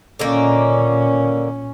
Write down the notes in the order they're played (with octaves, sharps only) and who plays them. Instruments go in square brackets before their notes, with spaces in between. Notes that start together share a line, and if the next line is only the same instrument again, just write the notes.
[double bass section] A#2 C#4 [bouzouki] D3 D#3 A#3